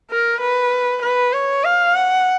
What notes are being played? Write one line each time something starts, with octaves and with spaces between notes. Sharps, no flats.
A#4
B4
B4
C#5
F5
F#5